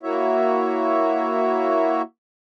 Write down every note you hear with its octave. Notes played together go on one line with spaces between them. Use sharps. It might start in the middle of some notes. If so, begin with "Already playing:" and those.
A#3 E4 F#4 C#5 E5